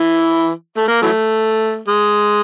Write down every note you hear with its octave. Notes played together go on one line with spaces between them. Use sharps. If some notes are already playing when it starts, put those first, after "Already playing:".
Already playing: E3
A3
A#3
E3 F#3 A3
G#3